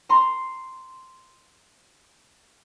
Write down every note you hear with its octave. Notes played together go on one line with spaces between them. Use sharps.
A#5 C6